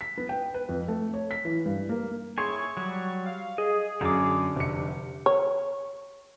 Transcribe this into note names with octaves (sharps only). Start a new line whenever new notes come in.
B6
B3
G5
B4
F2
A3
C#5
B6
E3
G2
A#3
E4 G#4 C#5 G#5 C6 C#6
F#3 G3 C#6
F5
G#4 D#5
F#2 D3 D6
F1 C3 C#7
C#5